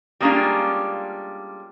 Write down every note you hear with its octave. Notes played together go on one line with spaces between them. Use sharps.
G3 G#3 A#3 C#4 D4 F4